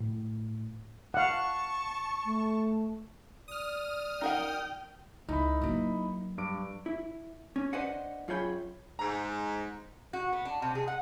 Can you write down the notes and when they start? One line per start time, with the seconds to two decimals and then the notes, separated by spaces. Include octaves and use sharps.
0.01 A2
1.14 F5 F#5 A5 C#6
2.25 A3
3.48 D5 D#6 F6
4.21 D#4 A#4 F#5 G5
5.29 C#2 D#4 E4 B5
5.61 F#3 A#3
6.38 G2 D6 D7
6.86 E4
7.56 C#4
7.73 D4 B4 C5 D#5 F#5
8.28 F#2 F4 G#4 C#5 G5 B5
8.99 G#2 A#5
10.13 F#4
10.33 B3
10.45 D4
10.62 C3
10.75 G#4
10.88 F#5